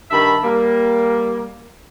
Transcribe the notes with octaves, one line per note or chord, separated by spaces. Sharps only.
G2 D#3 E5 A5 B5
G3 A#3